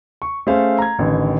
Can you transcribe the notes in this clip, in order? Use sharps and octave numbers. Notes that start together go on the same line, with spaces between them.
C#6
A3 C#4 G#4 A4 C5 F5
A#5 G#6
A1 D3 D#3